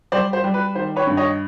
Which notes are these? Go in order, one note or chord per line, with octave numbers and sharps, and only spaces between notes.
G3 C5 D5
C5
G3
B4
D#3 C5
B4 C#5
G2
C#5 D#5